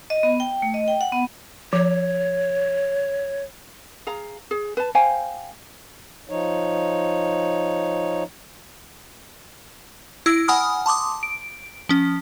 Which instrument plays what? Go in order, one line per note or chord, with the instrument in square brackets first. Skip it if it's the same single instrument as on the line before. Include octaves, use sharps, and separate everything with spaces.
[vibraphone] D#5
B3
G5
A3
D#5
G5
F#5
B3
[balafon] F3 [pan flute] C#5
[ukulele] G#4 F5 A#5
G#4
B4 A5
C5 F5 G5 G#5
[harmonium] F3 D#4 C#5
[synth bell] E4 E6 A#6 D7
F#5 G#5 B5 D#6 F6
A5 C6 D6 D#6
D7
F3 C#4